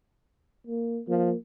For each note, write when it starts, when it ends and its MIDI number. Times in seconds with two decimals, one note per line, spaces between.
0.67 1.01 58
1.08 1.32 53
1.08 1.36 58